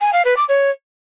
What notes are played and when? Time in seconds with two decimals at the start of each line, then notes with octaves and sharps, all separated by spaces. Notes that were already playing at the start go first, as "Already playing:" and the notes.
0.01 G#5
0.13 F5
0.25 B4
0.37 D6
0.49 C#5